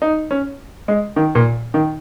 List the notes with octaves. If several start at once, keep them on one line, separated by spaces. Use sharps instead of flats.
D#4
C#4
G#3
D#3
A#2
D#3